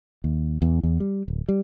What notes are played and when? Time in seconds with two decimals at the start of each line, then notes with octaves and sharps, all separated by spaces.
0.24 D#2
0.62 E2
0.83 E2
1.00 G3
1.28 D1
1.49 G3